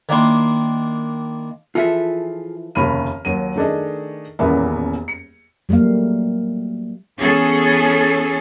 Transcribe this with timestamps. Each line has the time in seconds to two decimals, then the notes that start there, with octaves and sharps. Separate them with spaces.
0.09 D#3 A#3 D4 E4 C6
1.75 E3 F3 F4 G#4 A4 E5
2.75 F1 D#2 C#3 B5 F6 D#7
3.25 D#2 F#3 D#7
3.56 D#3 A3 D4 G#4 D#5
4.39 D#1 A1 E2 A#3 B3 E5
5.08 C#7
5.69 F#3 G3 A3 A#3 F5
7.18 E3 B3 C#4 G#4 A4